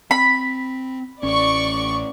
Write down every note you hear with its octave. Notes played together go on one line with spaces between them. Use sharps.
C4 B5
A1 C#4 D5 C#6